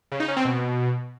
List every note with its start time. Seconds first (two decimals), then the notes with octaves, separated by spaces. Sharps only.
0.12 C#3
0.20 D#4
0.28 C#4
0.37 C4
0.45 B2